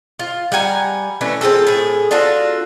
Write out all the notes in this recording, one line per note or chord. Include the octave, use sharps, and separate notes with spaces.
F4
G3 F#5 G#5 A#5
E3 A3 C#4 D4
C4 F4 G#4 A4
A2 G#4
D4 F4 F#4 A4